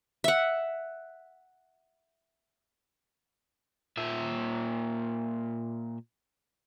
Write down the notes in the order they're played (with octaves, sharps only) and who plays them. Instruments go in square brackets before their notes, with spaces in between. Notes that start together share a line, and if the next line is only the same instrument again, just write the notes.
[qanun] E5 F#5
[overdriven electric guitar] A#2 E5